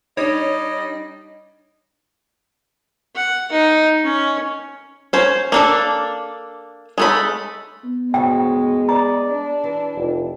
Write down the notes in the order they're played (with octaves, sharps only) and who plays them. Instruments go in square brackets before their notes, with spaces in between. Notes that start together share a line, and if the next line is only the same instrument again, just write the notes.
[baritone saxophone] G3 [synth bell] D4 D#4 [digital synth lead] C#5 [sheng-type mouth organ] D#5
[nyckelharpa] F#5
D#4
C#4
[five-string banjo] C#4 C5
A#3 D4 A4
G#3 A3 B5
[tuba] B3
[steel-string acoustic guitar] D2 G#2 C#3 [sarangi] G#3 [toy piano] G5
[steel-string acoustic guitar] D5 [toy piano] A#5
[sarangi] D4
[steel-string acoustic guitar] E3
[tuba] F1